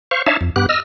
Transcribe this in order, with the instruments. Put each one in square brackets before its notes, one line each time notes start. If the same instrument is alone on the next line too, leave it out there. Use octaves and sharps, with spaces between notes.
[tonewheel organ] C5 F5 C#6
D4 D#4 C#5 E5 F5 A5
F2
G2 B3 G4 F#6
D#5 E6 F6